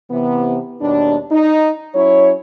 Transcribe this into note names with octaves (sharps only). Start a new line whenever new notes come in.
C3 E3 B3
D#2 B2 G3 D4
D#4
F#3 C#4 E4 C#5